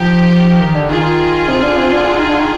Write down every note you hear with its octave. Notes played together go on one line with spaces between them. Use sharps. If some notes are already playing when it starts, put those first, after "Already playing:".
Already playing: F3 D#4 G4
F3
F3
D#3
D3
D#3 F4 G#4
C3
D3
C3
D3
D3
D#3
D3
D#3